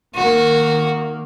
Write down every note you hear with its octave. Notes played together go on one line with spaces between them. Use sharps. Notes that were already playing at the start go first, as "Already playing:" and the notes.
D#3 A#3 F#4